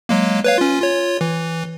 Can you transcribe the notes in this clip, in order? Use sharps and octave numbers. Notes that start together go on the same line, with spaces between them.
F#3 G#3 A#3
B4 C#5 F5
C#4 F4
F4 C#5
E3